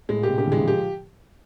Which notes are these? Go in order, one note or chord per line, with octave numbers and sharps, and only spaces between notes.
A2 G#3
A#2
C3 G4
D3 G4
E3
G#3
F3
G4